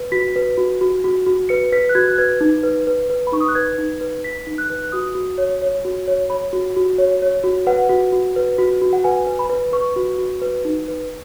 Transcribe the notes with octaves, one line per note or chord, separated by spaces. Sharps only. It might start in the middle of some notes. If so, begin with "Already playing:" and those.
Already playing: B4
F#4 B6
B4
F#4
F#4
F#4
F#4
B4 C#7
B4 B6
F#6
F#4 G#6
F#6
B4 G#6
D#4
B4
B4
B4
B5
D#4 C#6
D#6
F#6
B4 G#6
D#4
B4
B4 B6
D#4
F#6
B4
F#6
F#4 D#6
F#4
C#5
C#5
F#4
C#5
C#5 B5
F#4
F#4
C#5
C#5
F#4
B4 F#5
F#4
F#4
B4
F#4
F#4
F#5
B4 G#5
B4
B5
B4
B4 C#6
F#4
F#4
B4
D#4
B4